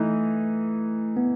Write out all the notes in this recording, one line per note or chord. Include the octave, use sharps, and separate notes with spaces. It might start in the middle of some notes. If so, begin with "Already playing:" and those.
Already playing: E3 A3 D#4
B3